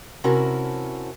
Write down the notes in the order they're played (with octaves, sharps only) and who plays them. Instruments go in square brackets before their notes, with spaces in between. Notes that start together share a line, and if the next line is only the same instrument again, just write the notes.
[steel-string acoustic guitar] C3 C#4 E4 F#4 A#4 A5